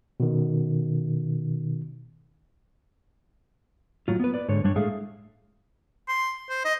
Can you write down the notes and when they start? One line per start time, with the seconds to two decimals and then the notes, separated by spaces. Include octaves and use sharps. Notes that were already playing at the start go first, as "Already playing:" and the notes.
0.20 B2 D#3
4.08 A2 F#3 F4
4.20 B3 B4
4.34 B4 D5
4.49 G#2 D3 C#5
4.64 G2 G3 D4 C#5
4.76 A2 G#3 G#4 A4 E5 F5
6.08 C6
6.50 C5
6.65 D#5